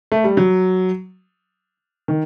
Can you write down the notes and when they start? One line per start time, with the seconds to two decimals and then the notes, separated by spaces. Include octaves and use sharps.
0.12 A3
0.24 G3
0.37 F#3
2.08 D#3